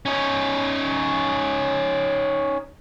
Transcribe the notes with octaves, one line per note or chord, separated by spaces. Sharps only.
C#4 D#4